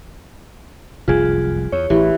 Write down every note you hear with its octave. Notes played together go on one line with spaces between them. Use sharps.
F1 C2 F#2 F4 G#4
E2 C#5
A1 E3 G4